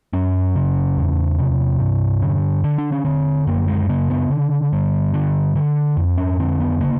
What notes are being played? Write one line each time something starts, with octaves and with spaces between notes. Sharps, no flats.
F#2 C#4
C#3
E2
C3
G2
D3
D3
D4
C#4
D3 C4
F#2 A#3
G#3
C#3 A#3
B3
D3
G2
D3
D3
F2
C#4
D3 C4
B3
C#3 A#3